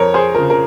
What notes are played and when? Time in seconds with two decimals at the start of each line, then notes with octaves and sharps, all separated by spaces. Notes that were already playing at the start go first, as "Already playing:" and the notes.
Already playing: F2 A#4 C#5
0.14 G#4 C5
0.35 C#3 F3 A#4
0.50 A#4